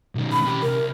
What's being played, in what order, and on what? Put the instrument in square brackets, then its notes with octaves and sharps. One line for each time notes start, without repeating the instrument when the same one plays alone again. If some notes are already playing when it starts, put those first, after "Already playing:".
[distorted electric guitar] B1 D#3
[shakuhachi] B5
[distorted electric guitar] C#4 G4
[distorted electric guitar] C2 [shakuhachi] A#4